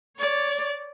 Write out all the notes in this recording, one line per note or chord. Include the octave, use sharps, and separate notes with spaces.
C#5 D5